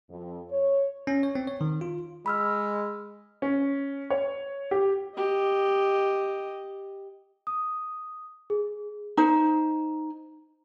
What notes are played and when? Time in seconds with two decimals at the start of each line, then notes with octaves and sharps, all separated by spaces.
0.10 F2
0.50 C#5
1.07 C#4
1.23 C#5
1.35 C4
1.47 C#5
1.61 D#3
1.81 F4
2.26 G#3 B5 E6 F6
3.42 C#4
4.10 C#5
4.71 G4
5.17 G4 D#5
7.47 D#6
8.50 G#4
9.17 D#4 C5